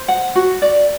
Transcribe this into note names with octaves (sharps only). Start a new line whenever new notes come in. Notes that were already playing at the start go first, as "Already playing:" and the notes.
Already playing: C5
F#5
F#4
D5